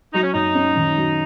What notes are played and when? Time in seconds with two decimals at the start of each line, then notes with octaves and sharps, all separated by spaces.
0.13 F#3 D#4
0.23 C#4
0.33 F#2 D#4
0.55 C#4
0.76 D#3
0.97 F#3